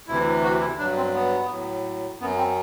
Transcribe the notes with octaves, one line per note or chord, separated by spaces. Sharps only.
D2 C3 E3 E4
F#4
E4
G2 F#3 D4
C4
B3
A2 F#3
F#2 F#3 B3
C4